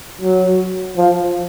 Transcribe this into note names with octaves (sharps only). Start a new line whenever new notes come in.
F#3
F3